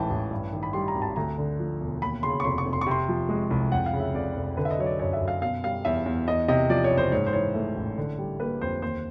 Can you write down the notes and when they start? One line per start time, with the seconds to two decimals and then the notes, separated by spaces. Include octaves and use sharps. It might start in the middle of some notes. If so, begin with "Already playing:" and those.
Already playing: A1 G#2 E3 G5 A5
0.10 A1
0.31 G2
0.52 D#3
0.63 B5
0.73 G3 C6
0.88 A#5
0.95 G#1
1.02 A5
1.16 D2 A#5
1.38 D3
1.59 F3
1.81 E1
2.02 D#2 B5
2.23 C#3 C6
2.40 C#6
2.44 F1 C6
2.58 C#6
2.65 F1
2.73 C6
2.81 C#6
2.86 C3 C6
3.09 F3
3.29 G#3
3.50 C2
3.71 F2 F#5
3.86 F5
3.93 C#3
4.00 E5
4.14 F1 D5
4.36 F1
4.57 D3 B4
4.65 E5
4.71 D#5
4.78 F#3 C#5
4.86 D5
4.99 F#2 C#5
5.13 E5
5.21 F#2
5.28 F5
5.41 B2 F5
5.64 G3 F5
5.85 E2 E5
6.06 E2
6.27 E2 D#5
6.48 C3 D#5
6.69 F3 D5
6.84 C#5
6.91 F#1
6.98 C5
7.12 G#2 C#5
7.26 C5
7.33 E3 C#5
7.54 A3
7.76 A1
7.98 D3
8.18 G3
8.40 A#3 B4
8.61 F2 C5
8.82 D#2 C5